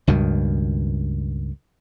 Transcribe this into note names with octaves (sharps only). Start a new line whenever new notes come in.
C#2 G2 B2 D#3